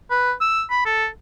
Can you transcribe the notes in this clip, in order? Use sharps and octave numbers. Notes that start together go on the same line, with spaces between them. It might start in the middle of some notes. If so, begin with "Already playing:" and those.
B4
E6
B5
A4